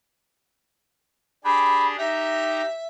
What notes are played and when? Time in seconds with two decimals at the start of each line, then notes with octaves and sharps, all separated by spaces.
1.44 D4 G4 G#4 B5
1.98 D#4 G4 E5 A#5